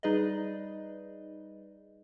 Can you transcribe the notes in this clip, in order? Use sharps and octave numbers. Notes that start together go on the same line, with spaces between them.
G3 D#4 G#4 B4 D5 D#5